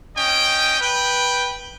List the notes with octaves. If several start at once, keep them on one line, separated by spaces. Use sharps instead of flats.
C#4 D#5 G5
B4 G5